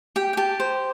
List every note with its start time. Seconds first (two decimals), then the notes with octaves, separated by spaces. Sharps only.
0.16 G4 G5
0.33 G5
0.37 G4 A5
0.60 C5